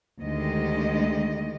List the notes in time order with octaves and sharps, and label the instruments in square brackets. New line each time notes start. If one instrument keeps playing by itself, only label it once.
[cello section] D2 D#3 G#3 G4 D#5